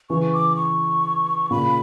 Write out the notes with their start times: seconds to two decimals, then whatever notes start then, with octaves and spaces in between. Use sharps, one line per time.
0.10 C#3 E3 C#6
0.33 D6
0.56 C#6
1.51 A#2 C#3 B5